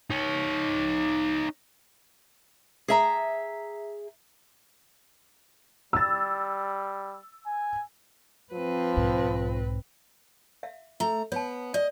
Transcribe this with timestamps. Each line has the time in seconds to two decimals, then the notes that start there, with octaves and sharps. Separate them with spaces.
0.10 D#4 C#5
2.88 G#4 E5 A#5
5.93 G3 E6 A6
7.46 G#5
8.53 F3 C4 B4
8.97 B1 G#2
10.63 E5 F5
11.00 A3 A#5
11.32 B3 C#5 A5
11.74 D5 D#5